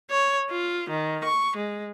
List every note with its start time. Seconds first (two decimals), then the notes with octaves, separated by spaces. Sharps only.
0.10 C#5
0.50 F4
0.89 D#3
1.24 C#6
1.56 G#3